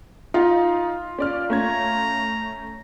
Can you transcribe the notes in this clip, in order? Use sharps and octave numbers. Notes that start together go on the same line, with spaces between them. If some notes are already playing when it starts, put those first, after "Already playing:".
D#4 F4
C#4 D5 F6
A3 C#4 A#5 G#6